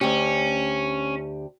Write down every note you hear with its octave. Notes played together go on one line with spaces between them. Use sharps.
D2 C#4 G4